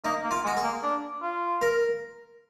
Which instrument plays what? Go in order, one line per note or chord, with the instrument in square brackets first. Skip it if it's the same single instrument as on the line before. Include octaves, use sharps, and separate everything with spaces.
[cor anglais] A#3 [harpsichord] D#4
[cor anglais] A#3
[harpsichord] F4
[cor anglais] G#3
[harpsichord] F#4
G#4
[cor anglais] A#3
D4
F4
[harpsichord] A#4